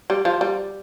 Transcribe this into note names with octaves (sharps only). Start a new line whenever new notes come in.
G3
F3
G3